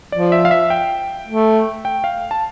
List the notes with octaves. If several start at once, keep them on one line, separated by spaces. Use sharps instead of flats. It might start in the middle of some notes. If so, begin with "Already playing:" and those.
F3 D5
E5
F5
E5
G5
A3
G5
F5
A5